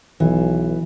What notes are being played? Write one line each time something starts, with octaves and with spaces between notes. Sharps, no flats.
B1 E3